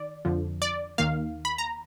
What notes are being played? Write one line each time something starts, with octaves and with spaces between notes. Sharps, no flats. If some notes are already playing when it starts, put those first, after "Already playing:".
Already playing: D#3 D5
F2 D3 F3
D5
D#2 D#3 A#3 F5
B5
A#5